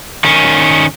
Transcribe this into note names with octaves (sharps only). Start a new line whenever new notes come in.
D#3 C#4